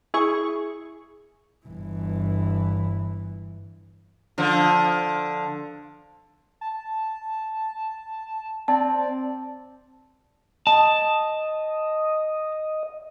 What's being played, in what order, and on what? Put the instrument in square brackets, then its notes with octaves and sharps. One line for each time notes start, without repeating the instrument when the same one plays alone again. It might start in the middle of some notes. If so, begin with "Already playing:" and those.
[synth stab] E4 G#4 C#6
[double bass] G1 E3
[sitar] D3 F3
[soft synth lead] A5
[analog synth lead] C4 [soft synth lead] D5 [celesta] A5
[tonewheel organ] D#5 [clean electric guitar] A5